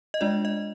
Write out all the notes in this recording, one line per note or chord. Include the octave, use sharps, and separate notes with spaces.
D#5
G#3 D4 F4 D5
D#5